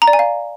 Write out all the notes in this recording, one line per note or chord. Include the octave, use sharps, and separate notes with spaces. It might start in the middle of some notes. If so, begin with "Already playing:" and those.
A#5
D5
G#5
F5